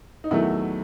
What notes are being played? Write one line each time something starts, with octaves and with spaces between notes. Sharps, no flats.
D#4
E2 D#3 F#3 A3 E4